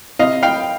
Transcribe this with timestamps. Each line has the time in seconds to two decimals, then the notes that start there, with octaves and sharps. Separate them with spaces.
0.19 C3 D#5 F5
0.43 F5 G5